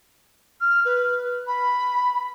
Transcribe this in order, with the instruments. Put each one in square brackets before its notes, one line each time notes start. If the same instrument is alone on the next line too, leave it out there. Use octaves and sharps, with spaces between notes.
[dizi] F6
B4
B5